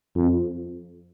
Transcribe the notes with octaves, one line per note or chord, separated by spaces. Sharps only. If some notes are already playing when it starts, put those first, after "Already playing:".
F2